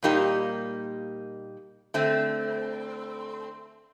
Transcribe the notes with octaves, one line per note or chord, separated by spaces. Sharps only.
A#2 G3 A#3 D#4 G4
D3 A3 C4